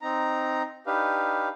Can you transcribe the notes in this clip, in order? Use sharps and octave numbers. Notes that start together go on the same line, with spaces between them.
C4 D#4 A#5
D4 D#4 G4 B4 F5